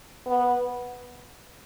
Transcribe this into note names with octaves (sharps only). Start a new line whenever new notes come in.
B3